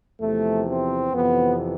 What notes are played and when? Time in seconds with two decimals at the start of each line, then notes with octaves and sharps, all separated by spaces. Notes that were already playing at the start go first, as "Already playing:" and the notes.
0.21 E2 C3 F3 A3
0.68 C4
1.13 F2 C3 E3 B3